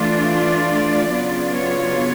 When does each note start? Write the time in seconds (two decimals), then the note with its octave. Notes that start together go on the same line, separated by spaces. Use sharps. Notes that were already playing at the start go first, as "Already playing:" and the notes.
Already playing: E3 A3 D4 F4
0.27 D5
1.11 C#3 F#3 B3 D4 F4
1.53 C#5